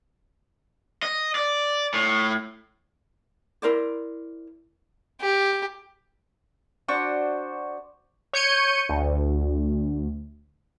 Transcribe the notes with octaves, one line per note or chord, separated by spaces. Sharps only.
D#5
D5
A2
E4 A#4 C5 D5
G4
D4 F#4 C5 C#6
C#5 G6 C#7 D#7
D2